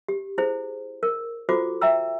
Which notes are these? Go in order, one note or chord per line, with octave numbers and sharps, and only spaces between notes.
G4
E4 G#4 C5
A#4
F4 F#4 A4 C5 D6
E5 G5 A#5 E6